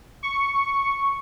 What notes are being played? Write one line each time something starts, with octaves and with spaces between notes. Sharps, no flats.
C#6